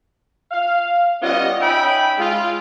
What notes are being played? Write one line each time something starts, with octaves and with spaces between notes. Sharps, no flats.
F5
G3 B3 C#4 F4 D#5
C#4 D#4 E5 G5 G#5 B5
G#3 F4